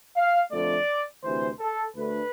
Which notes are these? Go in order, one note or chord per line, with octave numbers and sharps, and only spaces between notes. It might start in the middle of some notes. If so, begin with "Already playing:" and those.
F5
F2 D3 A3 D5
D2 C3 E3 C5
A4
D2 D3 A3 B4